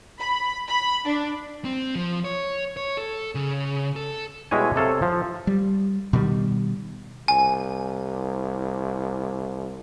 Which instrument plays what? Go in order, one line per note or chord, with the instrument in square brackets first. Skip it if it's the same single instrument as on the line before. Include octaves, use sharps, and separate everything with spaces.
[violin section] B5
B5
D4
[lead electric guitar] C4
F3
C#5
C#5
A4
C#3
A4
[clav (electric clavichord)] B2 G3 G#3 E4 C#5 G#5
C3 A4 C#5 F5
F3
[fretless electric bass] G3
B2 D#3 G3
[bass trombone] C2 [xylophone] G#5